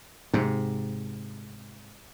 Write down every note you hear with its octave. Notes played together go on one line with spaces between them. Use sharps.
G#2 C3